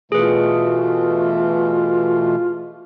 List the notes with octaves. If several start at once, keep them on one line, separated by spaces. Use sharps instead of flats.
B2 E3 A3 F4 G#4 B4